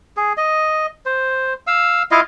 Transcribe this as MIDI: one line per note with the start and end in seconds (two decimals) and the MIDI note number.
0.17 0.33 68
0.37 0.86 75
1.06 1.53 72
1.67 2.03 77
1.67 2.03 88
2.11 2.21 64
2.11 2.21 65
2.11 2.21 75
2.11 2.21 77